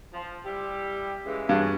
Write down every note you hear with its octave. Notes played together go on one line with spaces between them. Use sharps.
F3
G3 E4 G4
C#3 E3 G#3
G2 C#4 F#4 G#4